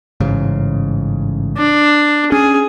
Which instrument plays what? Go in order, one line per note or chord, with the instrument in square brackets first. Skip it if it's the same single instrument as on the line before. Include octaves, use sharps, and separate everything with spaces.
[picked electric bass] A1 G#2 C#3
[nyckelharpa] D4
[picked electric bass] C#4 [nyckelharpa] G#4